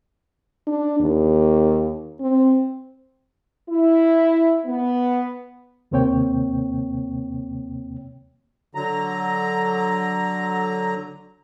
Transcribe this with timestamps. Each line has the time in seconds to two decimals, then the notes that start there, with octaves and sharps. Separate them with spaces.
0.67 D4
1.00 D#2
2.20 C4
3.69 E4
4.65 B3
5.91 D#2 C3 A#3 C4 C#5 G5
8.75 D3 F#3 A#5